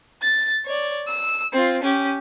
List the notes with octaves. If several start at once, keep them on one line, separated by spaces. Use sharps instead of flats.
A6
C#5 D5
E6
C4 F4
C#4 G4